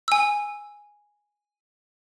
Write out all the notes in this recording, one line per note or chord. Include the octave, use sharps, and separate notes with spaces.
G#5 E6